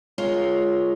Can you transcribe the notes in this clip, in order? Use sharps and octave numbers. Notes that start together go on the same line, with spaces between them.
G#3 F4 A#4 C#5